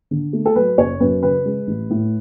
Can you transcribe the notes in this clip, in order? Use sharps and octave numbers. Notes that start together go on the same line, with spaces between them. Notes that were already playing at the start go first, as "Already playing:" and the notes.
D3
A3
A4
F#3 B4
F#1 C#5
F#2 B4
C#3 B4
G#3
A1
A2